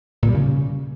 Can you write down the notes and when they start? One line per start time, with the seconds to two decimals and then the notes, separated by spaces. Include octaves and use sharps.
0.23 A#2
0.29 G3
0.35 C#3